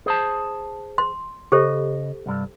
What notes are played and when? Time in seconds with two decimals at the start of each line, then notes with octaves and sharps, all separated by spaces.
0.06 G#4 C5 A5
0.98 C6
1.52 C#3 G4 A4 C5 D#5
2.26 C2 G2